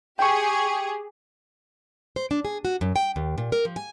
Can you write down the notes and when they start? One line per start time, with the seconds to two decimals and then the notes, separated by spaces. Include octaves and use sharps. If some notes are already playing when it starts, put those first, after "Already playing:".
0.19 G4 G#4 G5 C#6
2.16 C5
2.31 D4
2.45 G#4
2.65 F#4
2.81 F#2
2.96 G5
3.16 D#2
3.38 A#2
3.52 A#4
3.65 F3
3.76 G#5